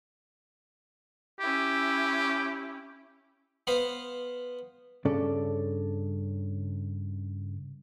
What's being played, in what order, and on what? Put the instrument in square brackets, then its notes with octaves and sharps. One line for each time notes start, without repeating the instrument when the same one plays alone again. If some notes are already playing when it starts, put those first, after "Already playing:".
[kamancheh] C#4 E4 [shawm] G4
[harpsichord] B3 B4 C5 F5
[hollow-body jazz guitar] G2 C#3 C#4 A4 D5